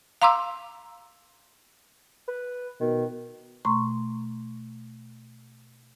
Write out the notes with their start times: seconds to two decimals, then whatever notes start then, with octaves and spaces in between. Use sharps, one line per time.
0.22 F5 A#5 C6 D6 E6
2.28 B4
2.80 B2 D#3
3.65 B2 A3 A#5 C6 C#6